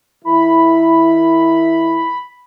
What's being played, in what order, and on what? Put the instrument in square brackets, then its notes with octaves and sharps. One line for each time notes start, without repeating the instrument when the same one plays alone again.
[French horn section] D#3 E4 [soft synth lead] B5